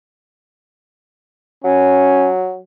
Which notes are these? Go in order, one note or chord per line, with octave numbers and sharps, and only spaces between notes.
F#3 C#4